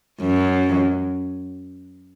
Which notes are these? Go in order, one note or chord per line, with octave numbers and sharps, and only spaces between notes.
F#2